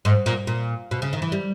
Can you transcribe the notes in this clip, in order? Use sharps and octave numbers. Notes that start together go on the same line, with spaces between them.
G#2
A#2
A#2
B2
C#3
D#3
E3
G3